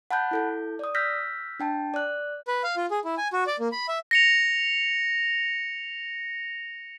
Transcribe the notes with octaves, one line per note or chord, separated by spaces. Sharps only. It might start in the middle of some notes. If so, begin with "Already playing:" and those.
F#5 A5 B5 F#6 G6
E4 A4 G6
D5 D#6
E6 F6 G6 A#6 B6
D4 G5 A5
D5 F#6
B4
F5
F4
G#4
E4
G#5
F#4
D5
A#3
B5
E5
A#6 C#7 F7